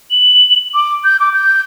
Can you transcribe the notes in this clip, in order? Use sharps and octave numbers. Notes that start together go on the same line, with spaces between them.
F#7
D6
G6
D6
G6